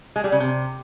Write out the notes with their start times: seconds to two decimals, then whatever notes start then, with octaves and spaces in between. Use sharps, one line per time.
0.16 G#3
0.24 G3
0.32 C#3
0.40 C3